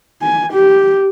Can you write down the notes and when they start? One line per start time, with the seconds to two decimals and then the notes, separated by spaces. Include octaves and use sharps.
0.22 G#5
0.54 G4